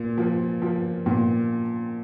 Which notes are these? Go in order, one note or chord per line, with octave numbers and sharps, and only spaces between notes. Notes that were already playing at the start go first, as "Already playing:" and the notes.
Already playing: A#2
F3
F3
A#2